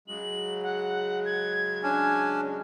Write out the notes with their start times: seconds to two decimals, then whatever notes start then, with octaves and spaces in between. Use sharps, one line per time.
0.08 C#3 F#3 G#3 F#7
0.63 F#5
1.25 G#6
1.83 C#4 D4